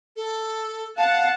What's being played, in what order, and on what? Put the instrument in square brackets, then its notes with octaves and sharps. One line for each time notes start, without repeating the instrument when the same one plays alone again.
[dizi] A4
[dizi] F5 [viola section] F#5 A5